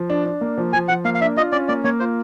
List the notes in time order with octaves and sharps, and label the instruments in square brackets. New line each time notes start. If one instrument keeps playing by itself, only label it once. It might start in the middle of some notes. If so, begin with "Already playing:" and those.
Already playing: [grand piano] F3
D4
D4
A#3
F3
[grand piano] F3 [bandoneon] G#5
[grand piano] F3 [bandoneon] F#5
[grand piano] A#3 [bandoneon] F5
[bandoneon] F5
[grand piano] D4 [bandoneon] E5
[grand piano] F4 [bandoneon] D#5
[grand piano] C#4 [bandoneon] D5
[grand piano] A#3 [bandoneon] D5
[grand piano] A#3 [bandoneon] C#5
[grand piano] F4 [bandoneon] C5